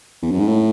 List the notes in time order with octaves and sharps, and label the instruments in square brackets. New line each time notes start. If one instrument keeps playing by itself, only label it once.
[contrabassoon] E2
F#2
G#2
A2